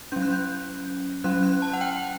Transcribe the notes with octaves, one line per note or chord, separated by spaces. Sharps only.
F#3 C#4 G6
F#6
G6
F#3 C#4 F#6
F#6
A5
F#5
G5